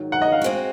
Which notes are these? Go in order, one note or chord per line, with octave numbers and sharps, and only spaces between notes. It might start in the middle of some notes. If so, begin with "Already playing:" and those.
Already playing: G#2 D#3 F#3
F#5
D#5
F5
G#3 C4 F#4